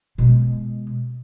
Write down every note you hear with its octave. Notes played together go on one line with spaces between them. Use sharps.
B2 G#3